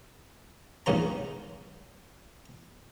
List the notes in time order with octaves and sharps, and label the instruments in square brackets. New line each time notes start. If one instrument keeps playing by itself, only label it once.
[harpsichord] A#1 D#2 G#2 D#3 C5 A#5